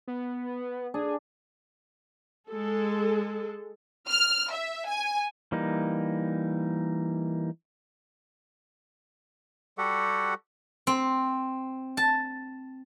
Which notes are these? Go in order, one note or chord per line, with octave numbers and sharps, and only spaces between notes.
B3
D4 G#4
G#3 A4
F6
E5
G#5
E3 G3 A#3 D#4
G3 F#4 G4 A4 F#5
C4
A5